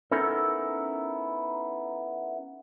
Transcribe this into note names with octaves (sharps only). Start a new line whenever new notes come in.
B3 C#4 D#4 E4 A4 A#4